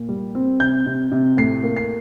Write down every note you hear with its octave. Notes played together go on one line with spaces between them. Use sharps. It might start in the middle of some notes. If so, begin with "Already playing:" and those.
Already playing: A#2
G3
C4
C3 G6
C3
C3
A2 C7
A#3
C7